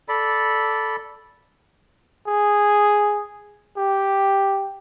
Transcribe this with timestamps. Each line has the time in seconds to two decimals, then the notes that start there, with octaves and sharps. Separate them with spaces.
0.09 A4 D5 B5
2.27 G#4
3.77 G4